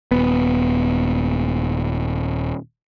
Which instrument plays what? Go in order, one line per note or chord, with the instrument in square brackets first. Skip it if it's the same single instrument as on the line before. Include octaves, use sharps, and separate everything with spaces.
[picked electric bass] D#1 B3